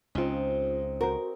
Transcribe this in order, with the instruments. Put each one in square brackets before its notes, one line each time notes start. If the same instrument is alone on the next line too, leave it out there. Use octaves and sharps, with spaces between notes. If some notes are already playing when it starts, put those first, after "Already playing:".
[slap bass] C#2 C#3 [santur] C4 D#4 [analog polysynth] C#4 F4
[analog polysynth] F#4 C5 [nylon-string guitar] A#4